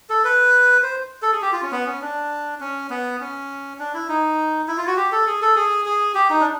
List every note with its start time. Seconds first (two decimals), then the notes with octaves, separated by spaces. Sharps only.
0.09 A4
0.24 B4
0.83 C5
1.22 A4
1.32 G#4
1.42 G4
1.52 F4
1.62 C#4
1.72 B3
1.86 C#4
2.01 D4
2.60 C#4
2.90 B3
3.20 C#4
3.79 D4
3.94 E4
4.08 D#4
4.68 E4
4.77 F4
4.87 F#4
4.97 G4
5.12 A4
5.27 G#4
5.42 A4
5.56 G#4
5.86 G#4
6.15 G4
6.30 D#4
6.41 D4